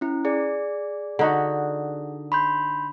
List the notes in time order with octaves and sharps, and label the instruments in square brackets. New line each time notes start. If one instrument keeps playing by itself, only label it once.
[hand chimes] C#4 E4
G#4 D5
[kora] D3 D#4 F#4
[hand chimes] B5 C6 G6